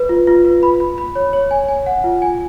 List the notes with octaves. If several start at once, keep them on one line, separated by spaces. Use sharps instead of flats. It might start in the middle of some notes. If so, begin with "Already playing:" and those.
Already playing: B4
F4
F4
B4
B5
B5
B5
C#5
C#5
G#5
G#5
F#5
F4
G#5